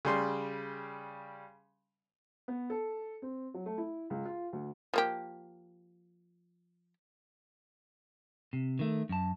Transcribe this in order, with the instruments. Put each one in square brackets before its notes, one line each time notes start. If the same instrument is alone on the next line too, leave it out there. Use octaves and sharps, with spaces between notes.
[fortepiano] C#3 G3 C6
[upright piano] B3
A4
C4
F#3
A3
E4
C#2
F4
D2
[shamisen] F3 A#3 G4
[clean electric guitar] C3
D#3 A3
F#2 A5